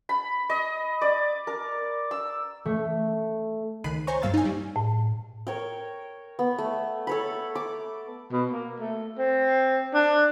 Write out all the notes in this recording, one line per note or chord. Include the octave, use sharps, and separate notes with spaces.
B5
D#5
D5
A#4
E6
A3
C#2 D#3 B5 F#6 C7 D#7
C5 C#5 G#5 A#5 C#6
G2 A#3 F5 E6 A6
D#4 G#5
G3
A2
A#4 C#5 G5
B3
A3
A4 C#5 B5
D6
B2
A#3
A3
C4
D4